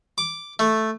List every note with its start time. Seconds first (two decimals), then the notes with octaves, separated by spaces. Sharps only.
0.18 D6
0.59 A3